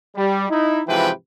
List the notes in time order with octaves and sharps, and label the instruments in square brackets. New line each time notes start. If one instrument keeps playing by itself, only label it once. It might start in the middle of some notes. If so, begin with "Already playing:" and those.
[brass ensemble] G3
D#4 E4
G#2 C3 E3 F3 B4 G5